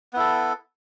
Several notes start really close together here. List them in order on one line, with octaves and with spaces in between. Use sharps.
B3 E4 A4